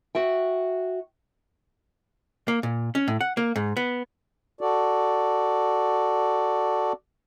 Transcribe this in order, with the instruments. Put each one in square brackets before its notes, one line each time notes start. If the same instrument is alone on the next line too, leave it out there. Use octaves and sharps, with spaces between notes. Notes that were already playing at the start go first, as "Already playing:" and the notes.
[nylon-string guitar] F#4 E5 G5
[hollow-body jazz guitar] A#3
A#2
C#4
A2
F#5
A#3
G#2
B3
[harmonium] F#4 A4 D5